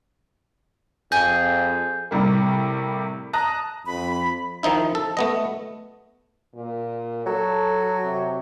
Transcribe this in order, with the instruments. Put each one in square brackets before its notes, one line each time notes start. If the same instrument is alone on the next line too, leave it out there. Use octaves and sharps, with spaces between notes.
[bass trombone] F2 [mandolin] G#4 [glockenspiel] G6
[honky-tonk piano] A2 C3 G3 A#3
A5 A#5 D#6 F#6 A#6
[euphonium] F2 [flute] B5
[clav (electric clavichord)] D#3 F3 D#4 E4
A4
A3 B3 D#5
[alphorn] A#2
[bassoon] F#3 [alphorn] A4
[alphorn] C3